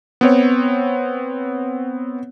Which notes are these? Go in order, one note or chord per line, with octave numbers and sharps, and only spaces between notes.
B3 C4 C#5